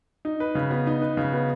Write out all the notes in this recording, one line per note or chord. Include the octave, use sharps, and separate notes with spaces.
D#4
B4
C#3
B3
D#4
B4
C#3
B3